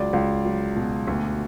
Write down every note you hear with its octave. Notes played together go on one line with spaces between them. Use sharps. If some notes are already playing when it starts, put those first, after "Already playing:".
Already playing: C#2 F#3 D5
C#2
F#3
B2
D2